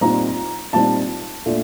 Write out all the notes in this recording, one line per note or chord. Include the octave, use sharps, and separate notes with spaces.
A#2 G3 C4 D#4 A#5
A#2 G3 C4 D#4 A5
A#2 A3 D4